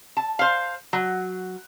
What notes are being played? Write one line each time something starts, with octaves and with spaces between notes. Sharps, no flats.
A5
C5 F5
F#3